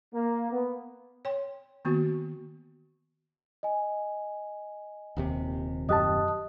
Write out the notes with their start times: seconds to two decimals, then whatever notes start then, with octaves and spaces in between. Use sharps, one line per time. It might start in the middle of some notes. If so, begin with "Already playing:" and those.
0.13 A#3
0.51 B3
1.25 C#5 G5 C6
1.85 D#3 A#3 B3 F#4
3.63 D#5 G#5
5.17 D#1 D#2 C3
5.89 F#2 G4 D#5 A5 D#6 F#6